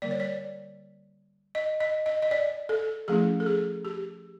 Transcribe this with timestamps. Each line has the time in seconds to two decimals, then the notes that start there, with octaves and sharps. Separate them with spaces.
0.02 D3 G3 A#3 D5
0.11 C#5
0.20 D5
1.55 D#5
1.80 D#5
2.06 D#5
2.22 D#5
2.31 D5
2.69 A4
3.08 F3 A3 C#4 E4 G#4
3.40 A4
3.46 G#4
3.85 G4